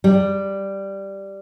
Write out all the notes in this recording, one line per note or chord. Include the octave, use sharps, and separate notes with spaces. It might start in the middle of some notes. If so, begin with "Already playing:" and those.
G3